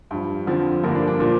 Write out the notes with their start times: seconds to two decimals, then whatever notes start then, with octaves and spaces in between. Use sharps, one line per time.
0.11 G2 F3
0.47 F2 D3 F3
0.83 G2 D3 F3 A#3
0.95 D4
1.07 D4
1.20 A#2 F3 A#3